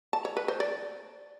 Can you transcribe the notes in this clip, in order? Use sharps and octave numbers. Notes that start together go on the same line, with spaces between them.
A5
C#5
B4
C5
D5